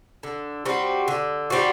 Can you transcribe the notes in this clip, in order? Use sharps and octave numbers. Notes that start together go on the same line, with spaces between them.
D3
G3 C4 F#4
D3
G3 C4 F#4